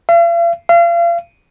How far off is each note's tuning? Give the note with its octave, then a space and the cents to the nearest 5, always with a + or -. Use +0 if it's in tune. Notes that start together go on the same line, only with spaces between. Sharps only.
F5 -45
F5 -35